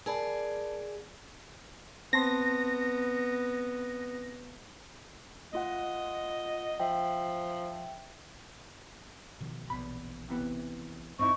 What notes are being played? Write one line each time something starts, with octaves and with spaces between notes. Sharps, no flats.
G#4 A#4 D5 A5 B5
B3 C4 A5 C6 A#6
A3 F4 D#5 F#5
F3 E5 G5
B2 D#3 F3
A#1 E2 B2 B5
C3 E3 B3
E1 G2 C4 D#4 E4 C#6